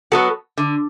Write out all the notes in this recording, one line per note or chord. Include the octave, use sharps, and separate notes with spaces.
F#3 B3 F#4 A4
D3